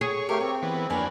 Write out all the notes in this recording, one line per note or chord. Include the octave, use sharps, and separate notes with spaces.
G#4 C#5
A3 G4 A#4 F5
C4 G5
E3 B3
F2 A#3 D4 B4 C#5 G#5